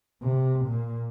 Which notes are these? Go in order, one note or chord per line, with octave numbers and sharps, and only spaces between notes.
C3
A#2